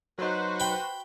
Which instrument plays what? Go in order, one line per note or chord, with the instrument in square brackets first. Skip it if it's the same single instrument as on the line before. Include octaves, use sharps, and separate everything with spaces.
[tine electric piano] F#3 D#4 [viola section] F#4 B4 C5
[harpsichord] G5 B5